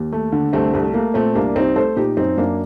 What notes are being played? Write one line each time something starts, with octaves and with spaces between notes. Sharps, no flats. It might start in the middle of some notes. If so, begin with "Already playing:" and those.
Already playing: D#2
A3
D3
C2 A3 C4
C2 A3
A3 A#3
A#2 A3 C4
C2 A#3 D4
C2 C4 D#4
A3 A4 C5
A#2 D#4 G4
F#2 C4 D#4
F#2 A#3 D4